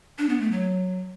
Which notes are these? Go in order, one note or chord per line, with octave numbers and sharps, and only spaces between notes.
D4
B3
A3
F#3